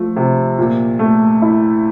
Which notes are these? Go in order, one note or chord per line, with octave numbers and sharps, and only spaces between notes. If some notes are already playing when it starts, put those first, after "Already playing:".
Already playing: F3 A3
C3
A#2
A3
E4